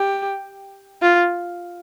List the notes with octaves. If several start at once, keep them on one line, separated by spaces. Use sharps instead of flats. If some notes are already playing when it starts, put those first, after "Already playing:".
Already playing: G4
F4